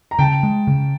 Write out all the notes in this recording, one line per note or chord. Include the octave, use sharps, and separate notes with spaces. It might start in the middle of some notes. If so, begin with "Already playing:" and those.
A#5
C#3 G5 A5
G#3
C#3